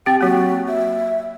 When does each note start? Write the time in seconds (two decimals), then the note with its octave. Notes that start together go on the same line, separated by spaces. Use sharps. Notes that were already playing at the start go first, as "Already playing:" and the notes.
0.06 C4 G4 G5
0.21 F#3 A#3 F#4
0.68 E5